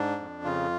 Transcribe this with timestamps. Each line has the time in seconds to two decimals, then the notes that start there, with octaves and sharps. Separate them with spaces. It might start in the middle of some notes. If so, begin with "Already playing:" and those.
Already playing: G#2 D4
0.19 F2
0.44 C#3 F4